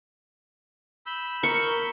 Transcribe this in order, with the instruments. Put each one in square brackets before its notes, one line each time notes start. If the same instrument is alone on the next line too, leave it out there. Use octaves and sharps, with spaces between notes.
[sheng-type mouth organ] B5 E6 G6
[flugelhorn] A#4 [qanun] C#6